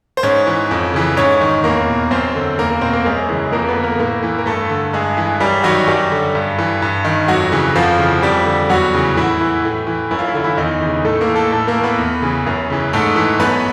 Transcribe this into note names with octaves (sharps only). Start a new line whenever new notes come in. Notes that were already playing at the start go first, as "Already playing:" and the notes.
C5
G#2 C#4 C#5
E3
F2
C#3 E3
G#2 C#4 C#5
D#3
E2 A#3 A#4
B2
F#2 C4 C5
D3
E2 A#3 A#4
A#3 A#4
B2 C4 C5
A#3 A#4
F#2 G#3 G#4
C#3 E3 G#3 G#4
F2 A#3 A#4
B3 B4
D3
A#3 A#4
A2 A#3 A#4
E3
A#4
G2 A3 A4
D3
G2 G#3 G#4
E3
F#2 G3 G4
D#3 F#3 F#4
F#2 G3 G4
D3
G2
E3
G2
D#3
F2 F#3 F#4
C#3 E3
F2 F3 F4
C#3 E3
F2 G3 G4
D3
E2 F#3 F#4
C#3 E3
A2 E3 E4
E3
A2
E3
F#2 E4
F4
E4
D3 F4
E3 E4
E2 D#3 D#4
C#3 E3
A2 A3 A4
A#3 A#4
E3
A3 A4
A2 A3 A4
A#3 A#4
E3
B3 B4
E2
C#3 E3
F#2
C#3 E3
G#2 A3 A4
E3
F#2 B3 B4